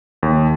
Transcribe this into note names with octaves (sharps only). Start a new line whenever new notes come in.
D#2